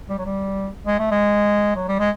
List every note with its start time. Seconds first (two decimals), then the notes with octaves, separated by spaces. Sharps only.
0.09 G3
0.18 F#3
0.25 G3
0.86 G#3
0.99 A3
1.11 G#3
1.76 F#3
1.88 G3
1.99 G#3